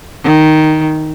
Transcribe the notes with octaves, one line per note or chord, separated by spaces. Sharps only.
D#3